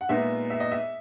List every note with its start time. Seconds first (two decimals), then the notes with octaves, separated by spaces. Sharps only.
0.01 F#5
0.09 A#2 G#3 B3 D#4 E5
0.50 E5
0.60 D#5
0.72 E5